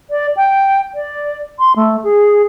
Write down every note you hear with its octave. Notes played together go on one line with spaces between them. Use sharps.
D5
G5
D5
C6
A3
G#4